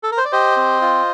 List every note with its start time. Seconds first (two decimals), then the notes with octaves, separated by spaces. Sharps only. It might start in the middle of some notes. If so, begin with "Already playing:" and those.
0.03 A4
0.12 A#4
0.18 C5
0.25 D5
0.32 G4 C5 D#5
0.56 C4
0.81 F4